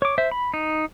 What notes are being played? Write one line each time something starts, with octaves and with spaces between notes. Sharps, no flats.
C#5 D6
C5 E5
B5
D#4